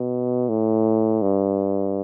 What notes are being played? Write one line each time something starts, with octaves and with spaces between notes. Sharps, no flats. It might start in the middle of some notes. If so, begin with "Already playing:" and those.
Already playing: B2
A2
G2